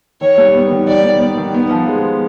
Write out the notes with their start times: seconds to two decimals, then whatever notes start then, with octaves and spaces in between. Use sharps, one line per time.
0.21 D#3 C#5
0.38 G3
0.55 B3
0.70 D#3
0.87 D#3 D5
1.04 G3
1.20 B3
1.37 D#3
1.54 B3
1.71 F3
1.88 G#3